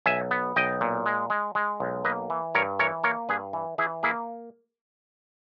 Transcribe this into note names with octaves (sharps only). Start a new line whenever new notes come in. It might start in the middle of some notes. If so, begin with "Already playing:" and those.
B1 E5 G#5
B3
B1 D#5 G5
A#2
G#3
G#3
G#3
B1
A#3 B4 D#5
E3
G2 A#4 C#5
E3 A#4 C#5
A#3 A#4 C#5
G2 G#4 B4
E3
E3 E4 G#4
A#3 E4 G#4